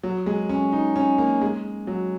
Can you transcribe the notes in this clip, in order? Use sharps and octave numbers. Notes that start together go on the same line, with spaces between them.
F#3
G#3
C#4
D#4
C#4
A#3
G#3
F#3